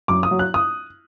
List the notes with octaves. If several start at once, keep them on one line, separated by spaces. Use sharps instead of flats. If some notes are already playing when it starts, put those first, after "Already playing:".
F#2 D6
D#6
F#3
F#6
D#6